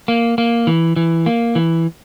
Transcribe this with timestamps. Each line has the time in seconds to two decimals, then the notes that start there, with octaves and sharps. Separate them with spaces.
0.08 A#3
0.38 A#3
0.67 E3
0.96 E3
1.26 A#3
1.55 E3